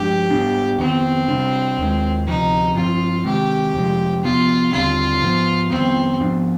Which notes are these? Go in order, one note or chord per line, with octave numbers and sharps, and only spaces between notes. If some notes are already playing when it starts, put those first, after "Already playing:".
Already playing: G2 F3 G#3 D4 G4
G#2 G3 B3 D4
F2 D#3 B3 C4
C3 G3 D4
D#2 D#3 G#3
D2 C3 F3 D#4
G2 F3 C4 F4
C3 D#3 G#3 C4 G4
F2 C3 F3 G#3
C3 F3 B3 F4
D#2 D3 G3 C4 F4
G#2 F3 G#3 B3
F2 D#3 G3 B3 C4
G#2 F3 B3 D4